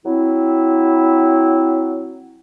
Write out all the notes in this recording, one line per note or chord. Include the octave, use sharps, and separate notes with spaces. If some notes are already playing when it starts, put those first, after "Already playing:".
F#3 C4 E4